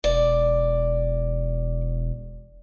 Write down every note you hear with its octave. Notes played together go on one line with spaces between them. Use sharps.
E1 D5